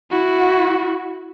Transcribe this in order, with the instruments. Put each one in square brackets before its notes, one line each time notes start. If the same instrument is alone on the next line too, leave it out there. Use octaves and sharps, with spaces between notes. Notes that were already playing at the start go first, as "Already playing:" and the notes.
[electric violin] E4 F#4